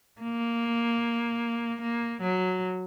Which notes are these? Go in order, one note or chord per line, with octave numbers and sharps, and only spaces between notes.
A#3
A#3
F#3